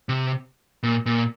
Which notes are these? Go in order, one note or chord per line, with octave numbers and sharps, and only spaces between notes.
C3
A#2
A#2